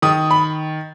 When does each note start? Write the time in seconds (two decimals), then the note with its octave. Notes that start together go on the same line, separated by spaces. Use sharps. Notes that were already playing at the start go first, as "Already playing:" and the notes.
0.02 D#3 D#6
0.31 B5